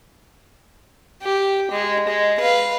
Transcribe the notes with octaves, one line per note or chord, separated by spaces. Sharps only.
G4
G#3
G#3
B4 F5